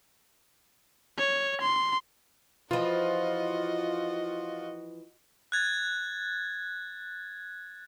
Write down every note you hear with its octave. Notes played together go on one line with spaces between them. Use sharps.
C#5
C6
E3 F3 F4 F#4 D#5
F#6 G#6 A6